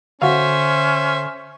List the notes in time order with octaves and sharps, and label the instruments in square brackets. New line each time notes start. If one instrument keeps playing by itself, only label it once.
[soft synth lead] D3 [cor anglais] C#4 [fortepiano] F#4 F5 [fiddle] C5 E5